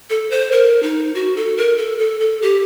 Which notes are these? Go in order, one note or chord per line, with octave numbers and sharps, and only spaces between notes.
A4
C5
A#4
D#4
F#4
A4
A#4
A4
A4
A4
G4